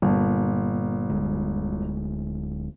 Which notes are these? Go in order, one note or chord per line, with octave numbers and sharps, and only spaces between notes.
G1 A#2 A#3
D1 D2 G#3